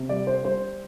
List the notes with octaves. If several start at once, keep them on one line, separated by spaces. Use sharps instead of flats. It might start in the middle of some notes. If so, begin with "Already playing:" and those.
Already playing: C3
G3 D5
C5
G3 C5